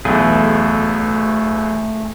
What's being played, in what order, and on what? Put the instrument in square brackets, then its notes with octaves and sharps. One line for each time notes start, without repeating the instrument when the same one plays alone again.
[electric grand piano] B1 E2 [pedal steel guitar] A3 G#4